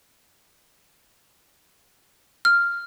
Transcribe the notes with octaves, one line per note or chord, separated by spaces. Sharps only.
F6